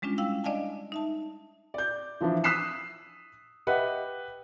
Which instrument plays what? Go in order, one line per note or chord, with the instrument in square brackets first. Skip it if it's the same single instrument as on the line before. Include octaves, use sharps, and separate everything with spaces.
[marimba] G3 G#3 C#4 D4 F4
E4 F5 G5 E6
D4 D5 D#5 F5 G#5 A5
D#4 E5 A5
[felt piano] D5 G6
E3 F3 D4 E4
D#6 E6 F#6 B6 C7 E7
G4 B4 D#5 E5 F#5